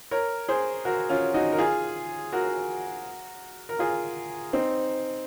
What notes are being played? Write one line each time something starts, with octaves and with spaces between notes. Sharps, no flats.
A#4 C#5
G#4 C5
F#4 A#4
C#4 F4
D#4 F#4
A#4
F4 G#4
F#4 A#4
A#4
F4 G#4
C4 D#4